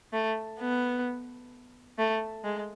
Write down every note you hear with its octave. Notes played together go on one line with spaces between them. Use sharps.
A3
B3
A3
G#3